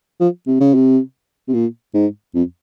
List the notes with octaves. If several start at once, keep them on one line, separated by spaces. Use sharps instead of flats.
F3
C3
C#3
C3
C3
A#2
G#2
F2